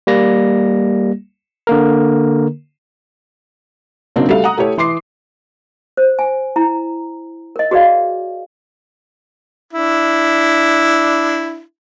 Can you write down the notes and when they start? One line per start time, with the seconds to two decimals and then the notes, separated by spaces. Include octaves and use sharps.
0.07 G3 A#3 A#6
1.67 D3 A#3 A#4
4.16 C#3 F#3 A#3 C4 D4 D#4
4.29 G3 A3 F#4 A4 E5 F5
4.44 F#5 A#5 D#6
4.58 A3 E4 G4 C#5
4.78 E3 C6 D6 C7
5.97 C5
6.19 G#5
6.56 E4 A#5
7.56 A#4 D#5
7.71 F#4 G#4 B4 D5 D#5 F5
9.73 D4 E4